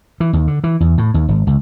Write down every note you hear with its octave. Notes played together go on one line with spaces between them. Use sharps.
E3
D#2
D3
E3
E2
A2
D#2
G#1
C#2